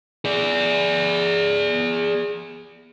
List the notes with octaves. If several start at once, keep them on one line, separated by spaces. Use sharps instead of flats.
G#4 D5